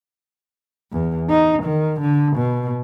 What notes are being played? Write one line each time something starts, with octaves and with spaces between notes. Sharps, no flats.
E2
D#4
D#3
D3
B2